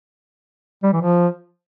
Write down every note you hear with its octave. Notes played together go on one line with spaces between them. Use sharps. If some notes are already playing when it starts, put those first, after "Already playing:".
G3
E3
F3